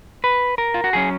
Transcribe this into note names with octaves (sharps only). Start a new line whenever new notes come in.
B4
A#4
F4
F#4
F#3 C#4 G#4